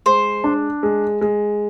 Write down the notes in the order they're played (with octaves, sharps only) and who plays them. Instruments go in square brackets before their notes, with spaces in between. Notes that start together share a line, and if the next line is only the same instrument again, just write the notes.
[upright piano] G#3 [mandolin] C5
[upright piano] D4
G#3
G#3